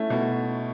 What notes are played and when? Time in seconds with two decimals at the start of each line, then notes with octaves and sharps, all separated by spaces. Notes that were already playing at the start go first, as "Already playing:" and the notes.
Already playing: A3 C#4 E4
0.10 B2